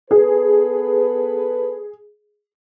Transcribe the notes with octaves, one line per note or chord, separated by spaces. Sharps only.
B3 G#4 A4 B4